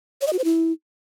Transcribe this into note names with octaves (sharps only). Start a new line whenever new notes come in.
C#5
D#5
F#4
C5
E4